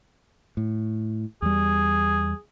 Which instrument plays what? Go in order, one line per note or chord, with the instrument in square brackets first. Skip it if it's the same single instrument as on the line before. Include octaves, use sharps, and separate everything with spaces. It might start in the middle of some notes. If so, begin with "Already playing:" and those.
[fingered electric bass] A2
[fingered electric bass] E2 G3 [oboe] G#4